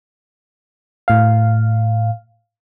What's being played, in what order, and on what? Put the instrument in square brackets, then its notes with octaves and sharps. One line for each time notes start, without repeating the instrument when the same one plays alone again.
[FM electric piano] A2 F5